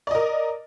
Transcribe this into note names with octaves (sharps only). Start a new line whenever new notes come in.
A#4 D5 D#5